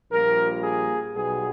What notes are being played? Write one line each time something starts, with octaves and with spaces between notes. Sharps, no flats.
A#1 A#2 G3 A#3 A#4
G#4
B1 B2 G3 B3 G#4